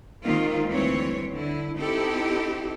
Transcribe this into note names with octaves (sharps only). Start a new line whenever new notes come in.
D#3 G#3 A#3 C4 F4
D2 E3 G3 C4 C#5
D3 E4
C4 D#4 E4 G4 A4